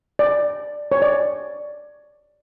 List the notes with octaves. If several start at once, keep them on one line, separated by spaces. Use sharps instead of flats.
D5
C#5
D5